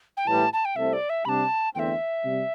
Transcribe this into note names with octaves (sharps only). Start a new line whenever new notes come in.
G5
A2 E3 G3 A5
A5
G5
C2 C3 A3 C4 A4 E5
D5
E5
C3 G3 D4 A5 B5
E2 D3 A3 C4 E5 G5
C3 G3